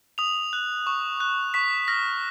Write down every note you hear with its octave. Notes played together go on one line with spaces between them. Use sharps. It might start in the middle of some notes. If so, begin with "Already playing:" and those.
D#6 F7
F#6
C#6
F#6
C#6 B6
F6 A#6